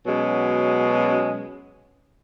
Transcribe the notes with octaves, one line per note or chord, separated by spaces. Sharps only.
B2 F#3 G#3 C#4